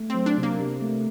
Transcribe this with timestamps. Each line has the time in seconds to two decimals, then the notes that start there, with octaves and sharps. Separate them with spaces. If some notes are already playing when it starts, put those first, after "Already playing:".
Already playing: A3
0.10 F#3 C4
0.26 D4
0.38 C3
0.43 A#3
0.59 C3
0.82 A3